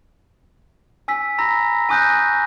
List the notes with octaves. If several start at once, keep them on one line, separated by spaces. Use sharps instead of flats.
G#5 E6 B6
A#5 B5 E6 A#6
G#5 C#6 D#6 F#6 G6 A#6